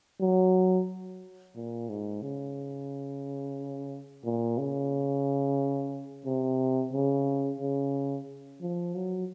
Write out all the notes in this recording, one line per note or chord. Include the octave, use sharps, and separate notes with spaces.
F#3
A#2
G#2
C#3
A#2
C#3
C3
C#3
C#3
F3
F#3